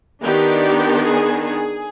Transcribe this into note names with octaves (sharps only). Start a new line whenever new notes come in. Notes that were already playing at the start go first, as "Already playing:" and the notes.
D#3 B3 D4 G4
G#4
G#4